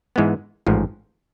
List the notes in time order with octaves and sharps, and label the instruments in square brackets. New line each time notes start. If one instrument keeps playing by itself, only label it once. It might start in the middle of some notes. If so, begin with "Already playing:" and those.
[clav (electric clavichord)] G#2 E3 G#3 B3
A1 G#2 F3